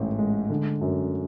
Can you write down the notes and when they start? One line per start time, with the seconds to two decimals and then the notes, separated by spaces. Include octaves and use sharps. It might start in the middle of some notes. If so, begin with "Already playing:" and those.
Already playing: A1 G#2
0.19 G#3
0.50 D3
0.81 F#2